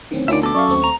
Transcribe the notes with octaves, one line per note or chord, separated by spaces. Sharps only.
D1 D#3 C4 C#4
D2 D#3 C#4 F4 D5 E5
B2 A4 D6
F#2 D5 E5 F5 C#6
D#2 A3 C4
A#5